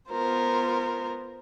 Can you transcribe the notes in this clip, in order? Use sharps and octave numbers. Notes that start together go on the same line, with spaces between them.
B3 F4 A#4 C5